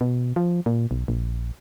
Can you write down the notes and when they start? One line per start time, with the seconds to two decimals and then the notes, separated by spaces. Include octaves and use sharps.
0.01 B2
0.36 F3
0.66 A#2
0.91 B1
1.08 A#1